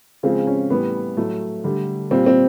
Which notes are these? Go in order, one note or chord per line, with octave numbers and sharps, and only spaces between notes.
C#3 F3 G#3 C4
C#4
A2 E3 G3 B3
A2 F#3 A3
D3 G3
A#2 G3 C4
C4